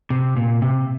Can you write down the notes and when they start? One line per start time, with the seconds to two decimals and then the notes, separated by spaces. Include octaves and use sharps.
0.10 C3
0.37 A#2
0.62 C3